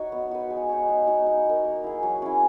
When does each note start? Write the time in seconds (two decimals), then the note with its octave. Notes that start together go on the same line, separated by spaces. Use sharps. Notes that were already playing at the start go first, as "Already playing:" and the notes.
Already playing: D#4 F#4 C#5 D#5
0.12 B3
0.31 F#4 B4
0.50 G#3
0.69 D#4 G#4 C#5
0.88 G#3
1.07 B3 D#4 F#4
1.26 D#4
1.46 F#4 A#4
1.64 A#3
1.84 E4 G#4
2.03 F#3
2.22 C#4 E4